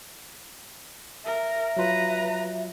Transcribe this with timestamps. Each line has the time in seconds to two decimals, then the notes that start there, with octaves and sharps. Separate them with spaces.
1.25 A#4 E5
1.77 F#3 F4 B4 A#5